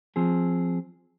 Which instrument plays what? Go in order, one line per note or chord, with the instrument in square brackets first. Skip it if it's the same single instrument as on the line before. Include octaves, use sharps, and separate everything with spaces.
[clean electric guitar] F3 C4 G#4